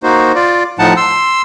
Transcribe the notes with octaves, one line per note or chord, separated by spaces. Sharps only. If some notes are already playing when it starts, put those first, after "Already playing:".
A#3 D#4 F#4 C5
F4 D5
A2 F3 D#4 F#5 A5
C6 E6